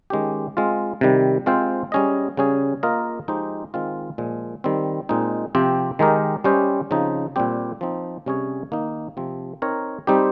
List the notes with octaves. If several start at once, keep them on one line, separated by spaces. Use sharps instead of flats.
D#3 G#3 C#4 G4
G#3 C4 F4
C3 D#3 G3
G#3 C4 F4 C5
G3 C#4 G#4 D#5
C#3 G3 C#4 G#4
A#3 F4 A#4 D#5
F3 G#3 D#4 G4 C5
D#3 G#3 C4 F4
A#2 F3 G#3
D#3 G3 C4
A#2 G#3 C4 D#4
C3 F3 C4 G4
D#3 G#3 D#4 G4 A#4
G3 C#4 G4 C5 D#5
C#3 F3 C4 D#4
A#2 G3 C4 G4
F3 C4 D#4
C3 G3 C#4 G#4 C#5
D#3 A#3 D#4
C3 F3 C4
C4 D#4 A#4 C#5
G3 C4 D#4 G4 C5